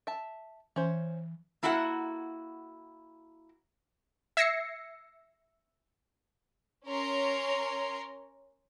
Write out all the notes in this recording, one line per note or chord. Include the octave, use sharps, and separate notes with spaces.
E5 A5
E3 C#4 C5
A#3 E4 F#4 A4 E5 F#5
E5 E6 G#6 A#6 C7 C#7
C#4 A#4 C#5 A#5 C6